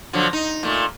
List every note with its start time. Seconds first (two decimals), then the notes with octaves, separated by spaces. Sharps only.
0.13 D3 F3 F#3
0.33 D#4
0.63 A#2 A3